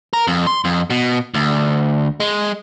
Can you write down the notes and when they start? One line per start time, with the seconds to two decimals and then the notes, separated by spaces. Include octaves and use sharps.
0.13 A#4
0.27 F2
0.47 C6
0.65 F2
0.90 B2
1.34 D2
2.20 G#3